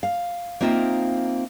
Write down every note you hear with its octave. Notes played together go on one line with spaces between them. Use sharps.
F5
A#3 C4 D#4 F4 E5